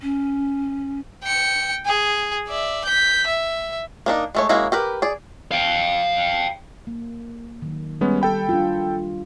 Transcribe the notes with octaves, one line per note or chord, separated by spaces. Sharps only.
C#4
G5 C#7
G#4
D5 E5
G6 B6
E5
A#3 D4 D#4
G#3 A3 C#5
G#3 A#3 C#4 E4 F#4
G4 A#4 B4
G#4 D5
F5 G5
A#3
D#3 F#3
G3 G#3 B3 C#4
A4 G5 B5
D4 F4